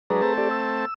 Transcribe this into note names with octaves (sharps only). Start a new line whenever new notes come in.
F#3 G#3 D4 G#4 B4 A#5
A3 C4 A5
G4 A4 D5
E6